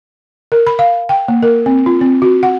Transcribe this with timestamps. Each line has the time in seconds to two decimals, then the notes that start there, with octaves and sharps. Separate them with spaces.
0.52 A#4
0.67 B5
0.79 F5
1.09 G5
1.28 A#3
1.43 A#4
1.66 C4
1.86 F4
2.01 C4
2.22 F#4
2.43 F#5